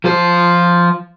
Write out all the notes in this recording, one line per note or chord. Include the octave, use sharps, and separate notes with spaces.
F3 C5